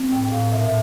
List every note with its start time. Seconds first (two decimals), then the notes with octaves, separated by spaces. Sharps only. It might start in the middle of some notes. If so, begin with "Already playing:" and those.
Already playing: C4
0.11 A2 G5
0.32 A2 F5
0.52 A#2 E5